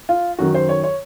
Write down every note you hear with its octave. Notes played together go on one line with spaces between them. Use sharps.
F4
F#2 D#3 F#3 F#4
C5
C#5
C#5